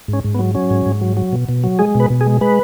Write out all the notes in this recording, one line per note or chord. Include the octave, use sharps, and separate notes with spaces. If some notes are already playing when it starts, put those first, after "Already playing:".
G#2 C#4
G#2
B3
F#3
F#3 C#4
G#2
G#2
F#3
F#3
B2
B2
F#3
G#3 G#4
B2
B4
B2
G#4
G#3
G#3 B4